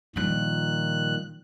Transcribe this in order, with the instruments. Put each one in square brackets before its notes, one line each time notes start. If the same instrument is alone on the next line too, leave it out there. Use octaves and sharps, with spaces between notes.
[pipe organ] A#2 D#3 F#6 [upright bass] F3 G3